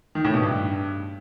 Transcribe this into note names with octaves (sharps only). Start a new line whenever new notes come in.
D#3
A2
B2
G2